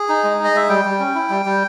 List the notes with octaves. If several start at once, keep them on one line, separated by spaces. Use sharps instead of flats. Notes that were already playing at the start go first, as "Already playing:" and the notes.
Already playing: G#4
D#4
G#3
D#4
D#5
G#3 E5
G3 G5
G3
C#4
E4
G3
G3